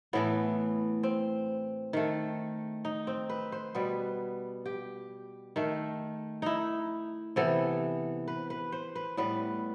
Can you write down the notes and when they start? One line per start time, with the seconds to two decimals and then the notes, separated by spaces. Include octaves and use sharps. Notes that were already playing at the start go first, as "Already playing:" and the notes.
0.13 A2 E3 A3 B3
1.03 C4
1.93 D#3 A3
2.85 D#4
3.07 C4
3.29 B4
3.52 C5
3.75 B2 G3 B3 B4
4.66 G4
5.56 D#3 A3
6.42 D#4 E4
7.36 C3 E3 B3 A4
8.28 B4
8.50 B4
8.72 C5
8.95 B4
9.17 A2 G3 B3 B4